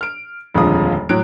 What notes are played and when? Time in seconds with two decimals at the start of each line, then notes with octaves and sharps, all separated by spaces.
0.01 F6 D7
0.54 D#1 F2 D3 G#3 F4 D#6
1.09 A2 F#3 F#6 D7